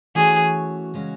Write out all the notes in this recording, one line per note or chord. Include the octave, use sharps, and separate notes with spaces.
E3 A3 C#4 F#4 G#4 C#5
C#3 G#3 C#4 F#4